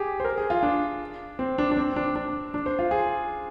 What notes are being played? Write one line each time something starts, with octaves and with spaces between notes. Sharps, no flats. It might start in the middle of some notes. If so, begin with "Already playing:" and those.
Already playing: G4 G#4
C5
A#4
G#4
F4
D4
C4
D4
D4
C4
D4
D4
D4
C5
F4
G#4